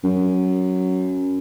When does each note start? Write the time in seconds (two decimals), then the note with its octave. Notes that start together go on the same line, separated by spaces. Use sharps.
0.04 F#2